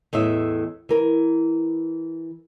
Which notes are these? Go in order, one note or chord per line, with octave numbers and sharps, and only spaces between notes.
E2 A2 D#5 E5
E3 A#4